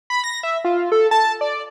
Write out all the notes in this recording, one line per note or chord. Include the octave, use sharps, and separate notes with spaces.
B5
A#6
E5
F4
A4
A5
D5